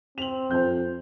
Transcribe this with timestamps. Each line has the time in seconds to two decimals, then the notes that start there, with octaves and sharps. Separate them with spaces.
0.18 C4 F7 F#7
0.51 F2 C5 G6